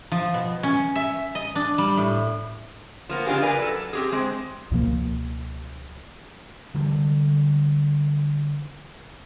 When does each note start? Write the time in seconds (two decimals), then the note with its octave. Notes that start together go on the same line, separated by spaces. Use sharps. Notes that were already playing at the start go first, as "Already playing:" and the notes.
0.12 F3
0.34 B2
0.63 C#4
0.96 E5
1.35 D#5
1.55 D4
1.78 G3
1.97 A2
3.09 F3 A#3 B3
3.26 C#3 D4 F4 G4 G#4
3.42 A#4 B4 D5 G#5
3.59 F#3 A4
3.93 C4 G4 G#4
4.12 G#3 C4
4.71 C#2 B2 F3 A#3
6.74 D3 E3 G3